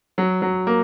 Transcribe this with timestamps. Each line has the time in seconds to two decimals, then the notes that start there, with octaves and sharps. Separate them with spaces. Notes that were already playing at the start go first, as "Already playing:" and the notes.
0.18 F#3
0.42 F#3
0.67 A#3